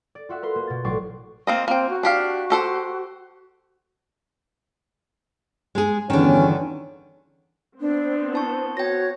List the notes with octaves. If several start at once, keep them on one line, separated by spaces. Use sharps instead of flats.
D5
F4 F#4 E5 F#5
A#4 B4 C6
A#3 A#4
B2 A6
A1 F#3 D5 C#6 D6 C7
A#3 C4 D#5
A#3 C4 G5
F#4
D4 G4 F5
G4 A4 C5
G#3 G#4
G1 E2 D3 D#3 C#4
B3 C4 D4 C5
E4 A5 C#6
F#4 C#5 G5 A#6